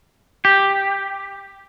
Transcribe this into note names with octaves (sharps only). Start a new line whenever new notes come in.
G4